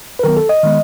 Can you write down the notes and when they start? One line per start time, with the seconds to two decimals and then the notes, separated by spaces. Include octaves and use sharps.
0.19 B4
0.23 D#3 F#3 B3 A#4
0.37 A4
0.49 D#5
0.63 D#3 G#3 B3